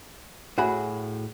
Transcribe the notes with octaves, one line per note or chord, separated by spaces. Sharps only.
A2 F#4 G#4 B5